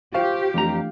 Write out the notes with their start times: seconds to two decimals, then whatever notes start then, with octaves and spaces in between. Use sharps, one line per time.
0.14 F4 G4 C5 F5 G5 C#6
0.54 F2 E3 A3 D4 A#5